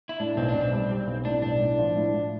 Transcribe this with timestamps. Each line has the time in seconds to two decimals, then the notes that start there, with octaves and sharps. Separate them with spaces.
0.09 E4
0.19 A2 D4
0.37 B1 C4
0.49 D4
0.55 B1
0.61 C4
0.73 G3
0.90 G3
1.07 B1
1.25 A2 D4
1.42 B1 D4
1.60 A2
1.78 F3
1.95 A2
2.13 A2